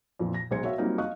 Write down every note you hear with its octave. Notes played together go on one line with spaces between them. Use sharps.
F2 A#2 E3
A#6
B1 G#3 C5 G#6 C#7
F#4 A#4 C#5 E5 F5
F#3 G3 A#3 C4 D#4 F4
D#5 F5 C#6 D#6 F#6